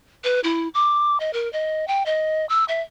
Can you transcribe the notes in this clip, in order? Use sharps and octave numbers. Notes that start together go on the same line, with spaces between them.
B4
E4
D6
D#5
A#4
D#5
G5
D#5
E6
E5